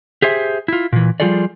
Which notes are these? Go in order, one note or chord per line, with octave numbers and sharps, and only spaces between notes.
G4 G#4 C5 E5
E4 F4
A#2 E3
F3 G3 F4 G#4 A4 D5